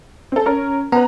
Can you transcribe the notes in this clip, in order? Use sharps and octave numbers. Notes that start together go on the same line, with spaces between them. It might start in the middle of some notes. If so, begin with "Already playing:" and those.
C4 A4
C#4 A#4
B3 B4 A#5